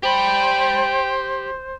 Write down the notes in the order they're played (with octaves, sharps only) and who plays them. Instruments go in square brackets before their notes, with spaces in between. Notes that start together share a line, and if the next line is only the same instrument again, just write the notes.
[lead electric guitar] G4 B5 [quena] C5 [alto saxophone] G5